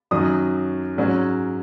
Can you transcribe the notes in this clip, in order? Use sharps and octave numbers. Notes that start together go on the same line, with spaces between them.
F#2 D#3 F#3 D#6
G#2 F#3 C#4